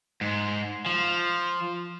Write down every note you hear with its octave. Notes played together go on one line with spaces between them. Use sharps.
G#2
F3